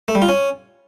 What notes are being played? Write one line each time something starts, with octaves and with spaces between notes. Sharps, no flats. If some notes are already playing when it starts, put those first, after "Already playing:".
A3
G3
F4
C#4